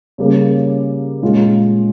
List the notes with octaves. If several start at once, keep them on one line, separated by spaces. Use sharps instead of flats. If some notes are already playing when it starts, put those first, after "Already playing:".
C#3 G3 A#3 C#4 G#4
A#2 G#3 C#4 F4